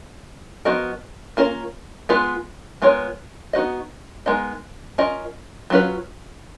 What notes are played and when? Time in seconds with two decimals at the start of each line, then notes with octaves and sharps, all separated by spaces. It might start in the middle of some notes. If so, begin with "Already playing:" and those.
0.65 F3 B3 F#4 A#4 D#5
1.37 A#3 C#4 F4 A#4
2.09 G#3 B3 F4 B4
2.82 G#3 B3 F4 A#4 C#5
3.53 B3 D#4 F#4 B4 D#5
4.26 G#3 B3 D#4 A#4 D#5
4.98 C#4 F4 A#4 D#5
5.70 F#3 C#4 F4 B4